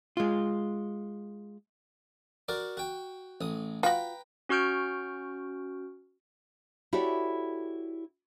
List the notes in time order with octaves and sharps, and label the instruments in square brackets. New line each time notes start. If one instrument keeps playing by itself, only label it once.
[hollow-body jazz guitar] G#3 F4
[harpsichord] F#4 A#4 D5
F#4 G5
A1 D#6
[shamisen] F4 F#4 [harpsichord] B4 G5 A#5
[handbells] C#4 F#4 C#6 F6 G6 D7
[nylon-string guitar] E4 F#4 G4 A4 C#5 D5